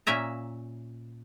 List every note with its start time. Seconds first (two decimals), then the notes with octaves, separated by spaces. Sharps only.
0.07 A#2 C#4 E5 A#5